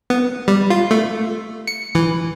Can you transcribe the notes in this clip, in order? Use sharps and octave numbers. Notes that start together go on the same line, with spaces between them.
B3
G3
F4
A3
C#7
E3